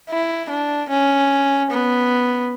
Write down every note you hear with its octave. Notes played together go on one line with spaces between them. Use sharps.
E4
D4
C#4
B3